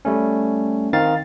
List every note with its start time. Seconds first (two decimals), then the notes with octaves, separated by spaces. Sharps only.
0.05 G3 A3 C#4
0.93 D#3 C4 D#4 F5 A6